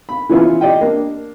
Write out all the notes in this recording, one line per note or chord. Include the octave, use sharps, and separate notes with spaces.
B5
E3 F3 B3 C#4 E4 F4
G4 D5 D#5 G5
A#3 D4